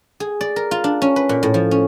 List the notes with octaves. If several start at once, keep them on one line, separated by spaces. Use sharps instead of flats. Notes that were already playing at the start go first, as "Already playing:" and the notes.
G#4
D5
A#4
F4
D4
C#4
B4
A#2
A2
F3
C#4